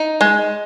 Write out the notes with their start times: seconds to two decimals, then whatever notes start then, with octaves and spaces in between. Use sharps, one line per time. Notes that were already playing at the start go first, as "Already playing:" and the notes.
Already playing: D#4
0.21 G#3